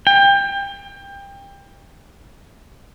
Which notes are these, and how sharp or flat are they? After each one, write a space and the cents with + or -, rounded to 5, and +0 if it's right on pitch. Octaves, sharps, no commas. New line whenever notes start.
G5 +25